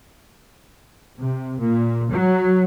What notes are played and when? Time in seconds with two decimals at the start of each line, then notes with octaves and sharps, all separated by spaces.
1.17 C3
1.60 A#2
2.10 F#3